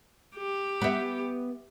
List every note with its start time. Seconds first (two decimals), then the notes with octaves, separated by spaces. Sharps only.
0.36 G4
0.81 B3 E5